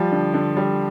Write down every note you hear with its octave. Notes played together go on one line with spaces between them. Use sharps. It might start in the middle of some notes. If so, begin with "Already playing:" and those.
Already playing: F3 G3
D3
D3
G3